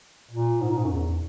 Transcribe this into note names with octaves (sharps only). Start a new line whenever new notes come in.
A#2
G#2
A#2
G#2
F#2
E2